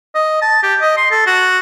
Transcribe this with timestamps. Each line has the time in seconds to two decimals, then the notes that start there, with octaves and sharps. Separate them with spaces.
0.15 D#5
0.42 A5
0.63 G4
0.81 D#5
0.97 C6
1.11 A4
1.27 F#4